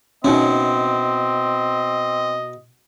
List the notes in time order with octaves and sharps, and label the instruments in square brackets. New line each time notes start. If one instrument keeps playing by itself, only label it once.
[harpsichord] B2 E4 [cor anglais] C4 [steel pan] C#4 D#4 [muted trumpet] D#5